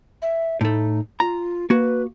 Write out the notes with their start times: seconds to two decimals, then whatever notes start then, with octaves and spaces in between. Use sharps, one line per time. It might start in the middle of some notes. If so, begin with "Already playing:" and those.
0.22 E5
0.61 A2 A3 D#4
1.20 F4 A#5
1.70 A#3 F#4 B4